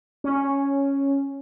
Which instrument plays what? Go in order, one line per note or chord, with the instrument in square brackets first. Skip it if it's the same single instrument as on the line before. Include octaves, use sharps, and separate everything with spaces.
[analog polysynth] C#4